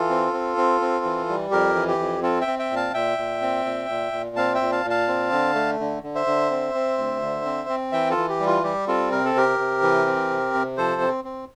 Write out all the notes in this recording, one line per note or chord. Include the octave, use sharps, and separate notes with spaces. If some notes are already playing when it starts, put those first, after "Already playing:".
Already playing: E3 F4 A4
C4
C4
C4
C4
E3
G3
F2 G4 A#4
E3
G4
F2
C4 F4 A4
E5 G5
C4
E5 G5
A#2
F5 A5
A#2 E5 G5
A#2
C4
A#2
A#2
A#2
C4 F5 A5
E5 G5
A#2
F5 A5
A#2
F5 A5
C4
D3
A3
D3
D3
C5 E5
D3
C4
C4
D2
D3
C4
C4
E3 E5 G5
F4 A4
E3
G4
G3
F4
G3 G4
C4 F4 A4
C3 A#4
A4
C3 G4 A#4
C3
E3
C4
C3
C3
F3 A4 C5
C4
C4